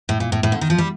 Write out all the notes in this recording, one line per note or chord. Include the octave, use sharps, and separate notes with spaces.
A2
A#2
A2
A2
D3
D#3
F3
G3